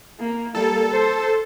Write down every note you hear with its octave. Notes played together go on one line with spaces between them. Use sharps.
A#3
G3 A#3 A4
C5